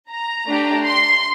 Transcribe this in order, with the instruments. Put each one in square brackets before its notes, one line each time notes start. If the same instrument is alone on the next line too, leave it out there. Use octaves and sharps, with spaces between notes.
[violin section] A#5
A3 D4 G4
C6